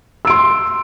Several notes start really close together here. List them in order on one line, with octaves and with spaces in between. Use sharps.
E6 D7 C6